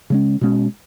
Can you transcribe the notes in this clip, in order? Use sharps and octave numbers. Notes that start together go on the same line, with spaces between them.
C#3 G#3 C#4
B2 G#3 C#4